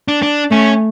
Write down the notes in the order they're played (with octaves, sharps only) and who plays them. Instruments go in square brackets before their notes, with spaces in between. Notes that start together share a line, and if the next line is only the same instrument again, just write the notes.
[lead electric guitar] D4
D4
[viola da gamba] A3 [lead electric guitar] C#4